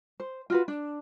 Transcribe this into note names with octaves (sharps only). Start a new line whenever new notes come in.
C5
F4 F#4 B4
D4